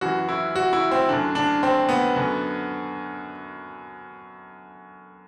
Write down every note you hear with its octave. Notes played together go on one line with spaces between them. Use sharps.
F#2 E3 F#4
E4
F#4
E4
C4
F#2 D3 D4
D4
C4
B3
F#2 D3